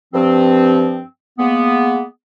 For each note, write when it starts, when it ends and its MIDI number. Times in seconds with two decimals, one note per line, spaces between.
0.14 1.00 43
0.14 1.00 53
0.14 1.00 60
1.39 2.03 56
1.39 2.03 58
1.39 2.03 59